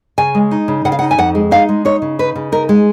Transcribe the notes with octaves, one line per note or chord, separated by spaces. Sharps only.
C#3 G#5
G#3
D#4
C#3
C#3 F#5
F5
F#5
D#4
G#5
F2 F#5
G#3
D#4 F5
G#3
D#4 C#5
C#3
D#4 B4
C#3
D#4 A#4
G#3